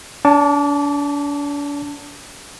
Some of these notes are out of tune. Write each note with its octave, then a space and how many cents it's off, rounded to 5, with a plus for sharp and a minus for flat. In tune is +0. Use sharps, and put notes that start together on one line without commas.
D4 -40 A5 +15 D6 -30